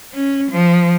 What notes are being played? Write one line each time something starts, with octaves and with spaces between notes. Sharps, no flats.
C#4
F3